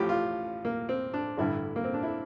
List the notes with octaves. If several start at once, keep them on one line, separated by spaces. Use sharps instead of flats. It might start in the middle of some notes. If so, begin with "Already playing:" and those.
Already playing: A1 A2 F3 G4
F4
A#3
C4
D4
A1 G2 D3 E4
A#3
C4
D4
E4